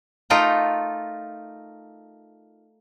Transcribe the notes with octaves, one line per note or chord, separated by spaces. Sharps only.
A3 D#4 F4 A#4 G5